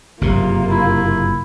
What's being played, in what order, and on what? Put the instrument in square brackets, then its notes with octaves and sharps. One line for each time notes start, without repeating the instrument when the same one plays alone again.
[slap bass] F#1 G2 C3 [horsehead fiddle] A#3 F4
[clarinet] E4